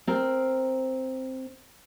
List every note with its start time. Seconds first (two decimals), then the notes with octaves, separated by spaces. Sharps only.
0.07 C4 A#4